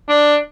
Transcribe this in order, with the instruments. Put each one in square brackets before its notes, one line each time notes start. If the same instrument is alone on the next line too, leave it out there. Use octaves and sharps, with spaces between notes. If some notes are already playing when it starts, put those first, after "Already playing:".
[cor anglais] D4